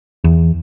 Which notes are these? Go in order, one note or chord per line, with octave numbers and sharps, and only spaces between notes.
E2